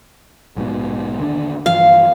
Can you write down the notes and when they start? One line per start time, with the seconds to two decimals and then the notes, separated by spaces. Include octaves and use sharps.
0.56 A#1 G#2 B2
1.19 D#2 D3 D4
1.66 G2 E3 F3 F5